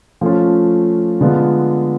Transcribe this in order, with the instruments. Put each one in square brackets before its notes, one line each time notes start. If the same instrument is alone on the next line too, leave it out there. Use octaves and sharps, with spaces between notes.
[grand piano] F3 A3 C#4 F4
D3 G#3 B3 F4